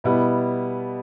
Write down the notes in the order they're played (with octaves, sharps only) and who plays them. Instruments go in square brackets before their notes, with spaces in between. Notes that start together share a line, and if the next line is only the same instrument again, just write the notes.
[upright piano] B2 G3 B3 E4